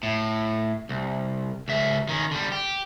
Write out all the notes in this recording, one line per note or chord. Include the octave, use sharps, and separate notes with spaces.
A2
C2
C#2 E5
D#3 C#4
D3 G3
G4